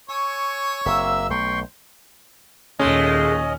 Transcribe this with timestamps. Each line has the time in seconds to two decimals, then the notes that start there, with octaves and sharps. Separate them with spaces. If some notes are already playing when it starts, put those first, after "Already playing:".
0.10 C#5 G#5 C#6 E6
0.86 F#1 A#3 C4 E5 E6
1.30 B1 A3 G5 C6 C#6
2.79 D#2 A#2 G#3 A3 C#4 D#5